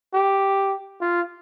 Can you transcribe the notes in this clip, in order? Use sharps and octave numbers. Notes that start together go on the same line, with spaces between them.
G4
F4